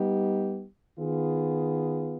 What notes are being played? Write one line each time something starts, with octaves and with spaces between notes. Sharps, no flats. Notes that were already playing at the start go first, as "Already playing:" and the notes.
Already playing: G3 B3 D#4 G4
D#3 B3 F4 G#4